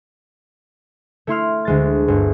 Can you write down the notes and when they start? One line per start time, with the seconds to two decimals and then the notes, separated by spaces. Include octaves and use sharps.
1.27 A3 E4 C6 F6
1.65 D2 G#3 A6
2.08 G1